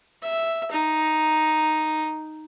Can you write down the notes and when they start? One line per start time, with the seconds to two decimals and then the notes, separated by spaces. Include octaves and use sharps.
0.23 E5
0.71 D#4